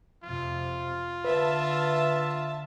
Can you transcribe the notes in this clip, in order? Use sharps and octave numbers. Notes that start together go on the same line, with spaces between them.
F2 C3 F4
D3 B4 E5 A5